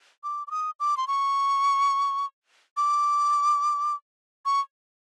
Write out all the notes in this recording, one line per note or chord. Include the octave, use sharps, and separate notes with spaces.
D6
D6
D#6
D6
C6
C#6
D6
C#6